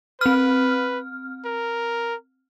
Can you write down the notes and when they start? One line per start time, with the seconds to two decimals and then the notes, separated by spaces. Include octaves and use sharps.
0.21 C4 B4 F6
1.45 A#4